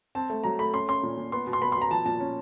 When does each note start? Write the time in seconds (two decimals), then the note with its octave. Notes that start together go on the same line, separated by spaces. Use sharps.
0.15 C4 A5
0.30 A3
0.44 F#3 A#5
0.59 A3 B5
0.73 C#4 C6
0.88 C#4 C6
1.03 A#2
1.17 A#2
1.32 B3 C6
1.47 B2
1.53 C6
1.62 B3 B5
1.72 C6
1.76 B2
1.82 A#5
1.91 F3 A5
2.06 A#2 A5
2.20 C#4